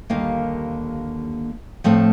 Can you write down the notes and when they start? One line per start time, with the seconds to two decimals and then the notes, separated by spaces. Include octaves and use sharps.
0.10 D#2 D3 G3 A#3 F5
1.84 A2 F3 A3 C4